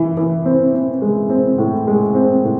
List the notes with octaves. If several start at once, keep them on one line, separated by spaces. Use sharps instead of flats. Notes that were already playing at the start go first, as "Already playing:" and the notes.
Already playing: E3
E3
C4
C4
G#3
C4
A2
G#3
C4
A2